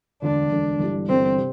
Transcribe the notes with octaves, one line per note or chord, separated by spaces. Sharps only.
E1 D2 D3 D4
E1 D2 D3
G1 G2 E3 G3
G1 G2 E3 G3 C4
C3 G3